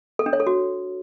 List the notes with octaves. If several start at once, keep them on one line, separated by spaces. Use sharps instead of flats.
A4
D4
C#5
A4
F#4